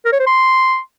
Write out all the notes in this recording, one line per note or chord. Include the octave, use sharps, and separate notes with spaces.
A#4
C#5
C5
C6